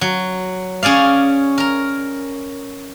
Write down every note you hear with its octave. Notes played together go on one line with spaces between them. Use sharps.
F#3
C#4 G#4 D5 F5
A#4 A#5